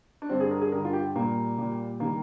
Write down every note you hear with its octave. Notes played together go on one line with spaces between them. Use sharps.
D4
G2 D3 G3 C4
G#4
A#4
G#4
G2 D3 G3 A#4
F4
G4
A#2 G3 A#3
A#2 G3
D#3 G3 A#3